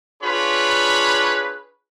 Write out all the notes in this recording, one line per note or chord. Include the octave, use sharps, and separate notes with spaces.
D4 F4 G#4 B4 C#5 B5